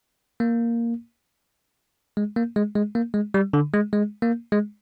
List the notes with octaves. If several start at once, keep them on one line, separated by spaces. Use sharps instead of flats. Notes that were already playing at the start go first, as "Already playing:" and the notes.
A#3
G#3
A#3
G#3
G#3
A#3
G#3
G3
D3
G#3
G#3
A#3
G#3